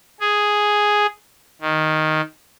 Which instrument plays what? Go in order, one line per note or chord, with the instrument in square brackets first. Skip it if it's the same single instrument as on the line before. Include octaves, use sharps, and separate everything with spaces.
[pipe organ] G#4
D#3